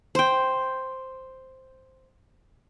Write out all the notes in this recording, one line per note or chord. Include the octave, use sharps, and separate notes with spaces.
C5 G5